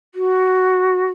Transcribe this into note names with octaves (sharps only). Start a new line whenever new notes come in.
F#4